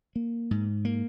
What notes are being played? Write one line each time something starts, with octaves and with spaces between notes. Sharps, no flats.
A#3
G#2
A#3